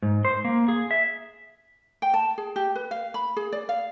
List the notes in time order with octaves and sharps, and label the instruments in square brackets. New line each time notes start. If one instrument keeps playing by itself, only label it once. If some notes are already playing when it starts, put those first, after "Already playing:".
[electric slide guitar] G#2
C5
A#3
G#4
E5
[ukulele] G5
A5
G#4
G4
B4
F5
B5
G#4
D5
F5